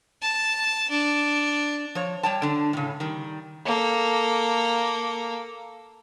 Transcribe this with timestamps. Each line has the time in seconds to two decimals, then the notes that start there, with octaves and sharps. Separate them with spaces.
0.22 A5
0.90 D4
1.95 F3 C#5
2.23 G3 C#5 G5 A5
2.42 D3 D4
2.73 A2 C#3
3.00 D#3 G3
3.65 A#3 A4